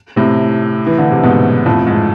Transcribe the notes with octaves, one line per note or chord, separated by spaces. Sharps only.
A2 C3
E3
D3
C3
G#2 B2
F2 A2
G#2